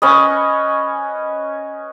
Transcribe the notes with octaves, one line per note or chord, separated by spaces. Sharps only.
C#4 B4 D#5